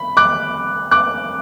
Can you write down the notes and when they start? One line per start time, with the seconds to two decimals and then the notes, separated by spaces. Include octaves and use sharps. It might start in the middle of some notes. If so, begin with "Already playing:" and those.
Already playing: B5
0.17 D6 F#6
0.91 D6 F#6